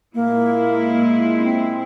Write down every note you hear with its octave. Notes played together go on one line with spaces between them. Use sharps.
A#2 G#3 A#3 E4
C#4
C4